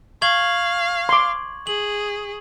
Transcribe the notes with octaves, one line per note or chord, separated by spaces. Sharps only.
F5 C#6 G#6 F#7
C6 D6
G#4 F#7